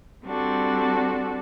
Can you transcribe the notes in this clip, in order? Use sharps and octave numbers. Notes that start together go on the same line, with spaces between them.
G3 C4 D4 F#4 A4